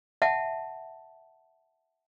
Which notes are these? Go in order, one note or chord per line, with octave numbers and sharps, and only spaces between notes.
E5 F#5 A5